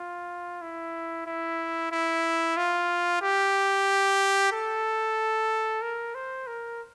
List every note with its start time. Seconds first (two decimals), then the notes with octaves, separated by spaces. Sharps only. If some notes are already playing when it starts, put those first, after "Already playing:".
Already playing: F4
0.62 E4
1.26 E4
1.92 E4
2.57 F4
3.22 G4
4.52 A4
5.82 A#4
6.15 C5
6.47 A#4